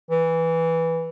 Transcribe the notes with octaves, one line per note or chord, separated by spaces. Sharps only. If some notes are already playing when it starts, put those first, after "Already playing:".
E3